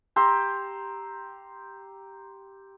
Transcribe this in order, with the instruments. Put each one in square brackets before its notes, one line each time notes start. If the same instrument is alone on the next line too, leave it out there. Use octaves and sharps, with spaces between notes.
[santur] G4 A#5 C6 E6